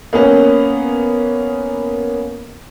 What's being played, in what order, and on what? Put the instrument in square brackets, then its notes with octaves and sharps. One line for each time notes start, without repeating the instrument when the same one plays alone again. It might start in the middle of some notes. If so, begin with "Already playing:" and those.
[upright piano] A#3 B3 C#4